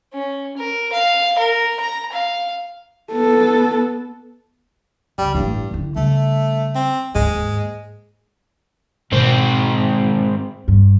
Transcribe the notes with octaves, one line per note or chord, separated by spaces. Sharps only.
C#4
A#4
F5
A#4
A#5
F5
B3 A4
C#2 G3
A1 G2 A3
D3 E3
C#3 G3 A3
C4
D#2 G#2 G#3
G#2 B2 G#3 C4
G2